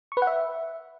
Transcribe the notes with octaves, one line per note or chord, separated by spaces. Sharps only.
C#6
B4
F#5
E5